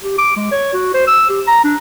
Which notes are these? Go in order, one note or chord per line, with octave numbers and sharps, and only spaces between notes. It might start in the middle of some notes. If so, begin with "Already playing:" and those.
G4
D6
G#3
C#5
F#4
C5
E6
G4
A#5
D4